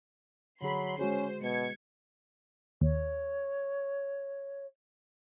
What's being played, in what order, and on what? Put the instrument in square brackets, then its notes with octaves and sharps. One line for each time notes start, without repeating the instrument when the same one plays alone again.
[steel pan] D3 G#4 [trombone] F#3 [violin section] B5 C6
[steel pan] G#3 F#4 G#4 [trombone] C#4 [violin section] C5
[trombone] B2 [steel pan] G#3 [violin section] G#6 C#7
[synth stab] D#2 [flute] C#5